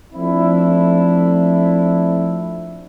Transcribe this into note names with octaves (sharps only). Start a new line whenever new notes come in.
F3 A3 C4 D4 E4